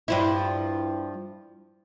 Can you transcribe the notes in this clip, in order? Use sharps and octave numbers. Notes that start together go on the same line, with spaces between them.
G2 F3 E4